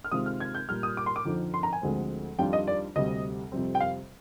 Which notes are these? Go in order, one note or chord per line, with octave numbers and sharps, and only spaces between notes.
F6
C3 D#3 G#3 C4 F4 D#6
F6
G#6
G6
A#2 G3 A#3 F6
D#6
D6
C6
D6
F2 D3 F3 C4 D#4
C6
A#5
G#5
D2 D3 F3 G#3 C4
F2 D#3 G3 D4 F4 G5
D#5
D5
D2 C3 G3 D#5
F2 C3 G3 C4
G5
F5